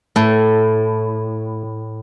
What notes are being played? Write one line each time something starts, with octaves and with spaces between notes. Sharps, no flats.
A2 A3